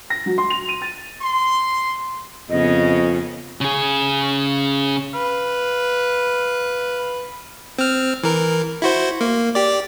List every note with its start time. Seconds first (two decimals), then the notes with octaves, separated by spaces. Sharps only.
0.10 A#6
0.26 F#3
0.38 C6
0.50 F7
0.69 D#7
0.82 A6
1.20 C6
2.50 F2 C#3 B3 C#4 D#5
3.61 C#3 G#4
5.14 B4 F5
7.78 C4 F6
8.23 E3 A#4
8.82 E4 F#4 C5
9.21 A#3
9.55 G4 D5